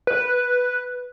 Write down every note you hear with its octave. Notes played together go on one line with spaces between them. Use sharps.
B4